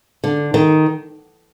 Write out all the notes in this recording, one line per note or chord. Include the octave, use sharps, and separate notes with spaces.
D3
D#3